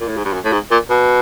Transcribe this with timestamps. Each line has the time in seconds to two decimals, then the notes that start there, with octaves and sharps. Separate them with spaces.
0.01 A#2
0.08 A2
0.17 G#2
0.25 G2
0.33 F#2
0.45 A2
0.52 G#2
0.71 A#2
0.90 B2